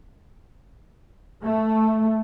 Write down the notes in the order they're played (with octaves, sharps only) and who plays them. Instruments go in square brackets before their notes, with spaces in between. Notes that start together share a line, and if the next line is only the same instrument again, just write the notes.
[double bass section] A3